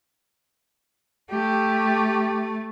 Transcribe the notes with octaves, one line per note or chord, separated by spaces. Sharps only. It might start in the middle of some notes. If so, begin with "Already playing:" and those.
A3 G4